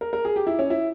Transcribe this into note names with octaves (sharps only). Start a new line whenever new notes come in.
A#4
A#4
G#4
G4
E4
C#4
E4